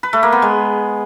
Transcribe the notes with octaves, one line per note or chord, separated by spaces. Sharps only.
B4
A3
A#3
B3
G#3